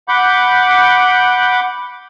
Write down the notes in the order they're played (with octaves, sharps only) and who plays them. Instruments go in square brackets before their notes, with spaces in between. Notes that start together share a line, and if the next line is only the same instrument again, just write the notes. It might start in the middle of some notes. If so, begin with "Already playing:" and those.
[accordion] F#5 B5 D6 G6